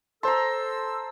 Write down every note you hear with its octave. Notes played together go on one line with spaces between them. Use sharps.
A4 C5 A5 A#5 C6 E6